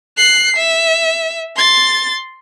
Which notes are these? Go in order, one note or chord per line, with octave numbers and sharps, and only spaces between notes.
F#6 C7
E5
C6 A6